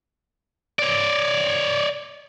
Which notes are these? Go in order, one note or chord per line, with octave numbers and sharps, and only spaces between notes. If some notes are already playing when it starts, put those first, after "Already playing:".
C#5 D5